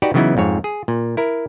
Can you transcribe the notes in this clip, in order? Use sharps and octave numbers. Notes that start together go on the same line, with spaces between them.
D#4 F#4 G4 B4 D5
C#3 E3 F#3 B3 D#4 E4
F2 G#2 C#5
G#4
A#2
E4 A#4